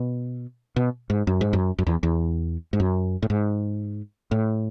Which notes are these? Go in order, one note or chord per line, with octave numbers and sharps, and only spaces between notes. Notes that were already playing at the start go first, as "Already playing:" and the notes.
Already playing: B2
B2
G#2
F#2
G#2
F#2
F#2
E2
E2
G#2
F#2
A2
G#2
A2